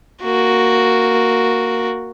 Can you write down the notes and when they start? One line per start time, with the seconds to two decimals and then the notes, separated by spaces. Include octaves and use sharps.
0.23 A#3 F#4